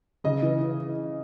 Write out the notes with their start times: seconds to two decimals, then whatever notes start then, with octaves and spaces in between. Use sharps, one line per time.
0.24 C#3 D#5
0.42 E3
0.61 E3